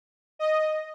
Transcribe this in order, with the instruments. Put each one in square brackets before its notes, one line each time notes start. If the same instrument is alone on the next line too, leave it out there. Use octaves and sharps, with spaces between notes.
[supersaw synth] D#5